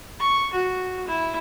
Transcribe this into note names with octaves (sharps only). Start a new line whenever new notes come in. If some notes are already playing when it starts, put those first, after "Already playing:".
C#6
F#4
E4